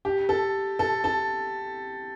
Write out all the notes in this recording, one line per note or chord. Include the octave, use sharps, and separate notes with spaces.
G4
A4
A4
A4